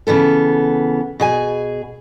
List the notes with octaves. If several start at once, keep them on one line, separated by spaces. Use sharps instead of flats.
C#3 E3 B3 A4
B2 G#4 G#5